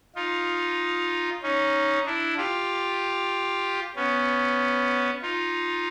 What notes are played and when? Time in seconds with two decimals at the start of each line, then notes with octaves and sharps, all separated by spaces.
0.16 D#4 F4
1.43 C#4 D#4
2.05 D4 E4
2.37 F4 G4
3.96 B3 C#4
5.22 D#4 F4